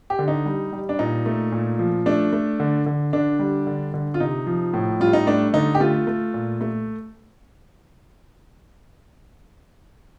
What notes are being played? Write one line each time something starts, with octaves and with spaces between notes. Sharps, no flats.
G4
D3
D#4
G3
G3
D4
A#2 D#4
A3
A#2
F3
A3 D4
A3
D3
D3
D3 D4
G3
D3
D3
F4
C3 D#4
F3
A2
G3 F4
D#4
A3 D4
D3 D#4
G4
A3 F4
A3
A#2
A3